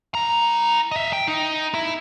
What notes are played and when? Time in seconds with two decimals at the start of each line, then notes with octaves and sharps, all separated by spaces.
0.15 E4 A#5
0.91 D#5 E5
1.13 G5
1.27 D#4
1.74 E4